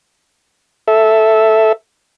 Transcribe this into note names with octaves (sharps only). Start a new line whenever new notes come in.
A4 E5